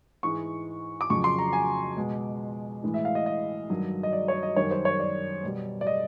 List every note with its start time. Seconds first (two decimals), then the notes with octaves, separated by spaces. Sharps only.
0.23 G#2 E3 G#3 C#6
1.01 D6
1.10 F2 C#3 F#3 C#6
1.24 C6
1.38 A#5
1.53 G#5
1.97 B2 G#3
2.83 A2 E3 G#3
2.94 E5
3.05 F5
3.15 D#5
3.26 D#5
3.69 G2 D#3 F#3
4.03 D#5
4.13 D5
4.28 C#5
4.43 D#5
4.56 F#2 D#3 G3 C#5
4.71 C5
4.85 C#5
5.00 D5
5.43 B2 G3
5.81 D5
5.87 D#5